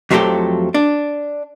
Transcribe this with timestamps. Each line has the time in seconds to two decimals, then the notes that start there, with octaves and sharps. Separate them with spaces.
0.11 F2 F3 F#3 G#3 A3 G4
0.74 D4